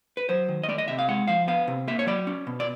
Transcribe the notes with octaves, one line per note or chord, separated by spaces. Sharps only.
B4
F#3 C5
D#3
D#5
A3 D5
D#5
C3 E5
F5
G#3 F#5
F3 F5
B3 F5
C3
A#3 E5
C#5
F#3 D5
C#4
B2
D5